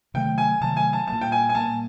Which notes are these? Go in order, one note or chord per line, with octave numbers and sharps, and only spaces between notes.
C3 D#3 F#3 A3 G5
G#5
C3 D#3 F#3 A3 A5
G#5
A5
A#2 G3 A#3 A5
G5
G#5
G#5
A#2 G3 A#3 A5